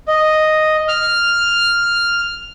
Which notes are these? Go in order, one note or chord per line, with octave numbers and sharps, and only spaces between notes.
D#5
F6